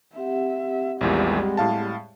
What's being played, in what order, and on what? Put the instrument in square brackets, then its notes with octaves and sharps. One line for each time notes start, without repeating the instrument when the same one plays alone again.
[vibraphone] C4 G4 F#5 [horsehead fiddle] E5
[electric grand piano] A#1 E2 A#2 [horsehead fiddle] G3 G#3
[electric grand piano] A2 F5 A5